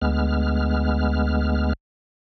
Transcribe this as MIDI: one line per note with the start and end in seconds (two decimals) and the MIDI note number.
0.02 1.73 38
0.02 1.73 56
0.02 1.73 59
0.02 1.73 89